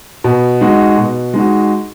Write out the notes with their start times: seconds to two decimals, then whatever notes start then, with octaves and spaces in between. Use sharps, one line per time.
0.24 B2
0.61 G#3 D#4 F#4
0.97 B2
1.34 G#3 D#4 F#4